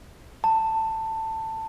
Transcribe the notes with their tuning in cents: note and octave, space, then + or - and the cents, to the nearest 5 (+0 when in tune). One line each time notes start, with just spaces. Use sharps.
A5 +15